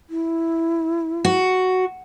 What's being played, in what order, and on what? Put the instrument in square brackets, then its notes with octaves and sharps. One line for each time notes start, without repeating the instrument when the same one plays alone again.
[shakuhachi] E4
[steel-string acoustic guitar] F#4